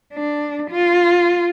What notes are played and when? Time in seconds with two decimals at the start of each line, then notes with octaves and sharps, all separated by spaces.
0.13 D4
0.71 F4